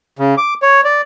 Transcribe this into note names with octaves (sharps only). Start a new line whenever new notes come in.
C#3
D6
C#5
D5